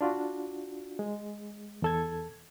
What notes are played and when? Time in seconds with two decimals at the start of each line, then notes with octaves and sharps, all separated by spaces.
0.01 D4 F4 F#4
0.99 G#3
1.82 E2 A4 G#6